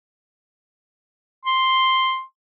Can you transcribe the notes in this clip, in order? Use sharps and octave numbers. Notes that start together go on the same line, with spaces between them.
C6